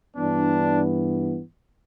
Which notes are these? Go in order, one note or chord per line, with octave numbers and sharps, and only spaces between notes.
G2 E3 B3 D4